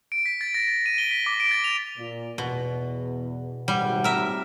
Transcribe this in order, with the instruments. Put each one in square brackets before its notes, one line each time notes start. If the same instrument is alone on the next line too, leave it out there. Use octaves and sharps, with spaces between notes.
[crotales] D7
B6
A6
A#6
A6
D#7
G7
B6
D6
D7
A6
F7
[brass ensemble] A#2
[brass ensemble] E2 [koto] B2
[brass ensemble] G#1 A2 F#5 [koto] G3
[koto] A#4 E5